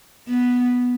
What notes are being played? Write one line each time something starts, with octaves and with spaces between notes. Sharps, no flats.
B3